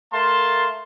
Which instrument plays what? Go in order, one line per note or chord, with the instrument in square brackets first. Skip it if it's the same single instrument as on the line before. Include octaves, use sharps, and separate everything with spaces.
[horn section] A3 A#4 F5 A5 C6